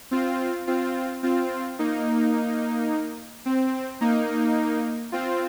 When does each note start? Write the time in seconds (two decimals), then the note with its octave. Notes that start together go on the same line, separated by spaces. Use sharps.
0.11 C4 F4
0.67 C4 F4
1.23 C4 F4
1.79 A#3 D#4
3.46 C4
4.01 A#3 D#4
5.12 C4 F4